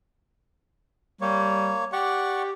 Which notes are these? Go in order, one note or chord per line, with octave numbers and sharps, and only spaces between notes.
G3 A#3 C#5
G4 D5 F#5 C#6